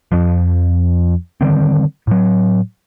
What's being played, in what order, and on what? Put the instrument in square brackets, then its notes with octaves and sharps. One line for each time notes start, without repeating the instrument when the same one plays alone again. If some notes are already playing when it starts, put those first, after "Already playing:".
[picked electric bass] F2 F3
D3 D#3 G3 C4
A2 F#3